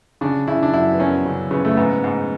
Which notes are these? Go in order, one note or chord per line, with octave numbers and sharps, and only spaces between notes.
C#3 D4
C#3 E4
D4
F#2 E4
B3
F#2 C#4
C#3
C#3 B3
A3
G#2 B3
G#2